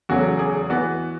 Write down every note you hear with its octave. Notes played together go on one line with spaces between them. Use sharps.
E2 C#3 F#3 A3 F#4
G#4
E3 B3 F#4